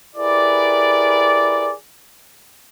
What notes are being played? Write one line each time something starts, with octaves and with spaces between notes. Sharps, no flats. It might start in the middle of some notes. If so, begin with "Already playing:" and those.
E4 G4 G#4 A#4 B4 D5